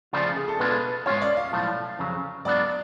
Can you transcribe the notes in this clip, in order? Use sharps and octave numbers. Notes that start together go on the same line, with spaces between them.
C#3 F3 A3 F4 D5
G#4
A4
B2 G#3 D4 F4 B4
G#2 G#3 C#4 F4 C#5
D5
F5
B1 A2 F3 A3
F2 C#3 F#3
G#2 F#3 B3 D4 F4 D5